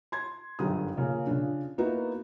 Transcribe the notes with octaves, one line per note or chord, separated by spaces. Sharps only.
C6 G#6
G1 F#2 D3 D#3 G4 D#6
C#3 F3 A#3 C#4
C#3 F3 D4
A#3 B3 D#4 E4 F#4